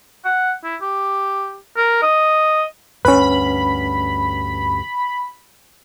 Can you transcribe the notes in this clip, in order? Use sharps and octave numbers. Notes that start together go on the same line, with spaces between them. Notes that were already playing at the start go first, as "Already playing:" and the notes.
F#5
E4
G4
A#4
D#5
D2 G2 C#4 B4 B5